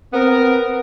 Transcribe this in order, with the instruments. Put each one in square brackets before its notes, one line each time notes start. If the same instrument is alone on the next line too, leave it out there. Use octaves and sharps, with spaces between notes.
[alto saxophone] B3 [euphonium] C4 [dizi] A#4